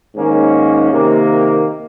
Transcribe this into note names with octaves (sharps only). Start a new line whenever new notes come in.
G#2 D#3 A#3 C#4
C3 D#3 A#3